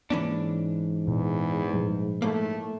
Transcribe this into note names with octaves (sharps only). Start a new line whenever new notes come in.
G#2 E3 A#3 C#4 D4
E2 A#2
A#2 F3 G3
A2 A3 A#3